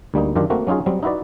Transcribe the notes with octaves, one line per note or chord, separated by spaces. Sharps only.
D2 G3 A#3 D#4
F#2 D#3 D4 F4 G4
A3 A#3 C4 F#4
F#3 C#4 D#4 F4 G#4
F#3 G3 C4
D#4 E4 F#4 B4 D5